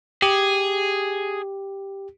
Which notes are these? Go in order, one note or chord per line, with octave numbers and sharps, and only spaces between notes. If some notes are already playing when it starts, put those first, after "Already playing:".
G4 G#4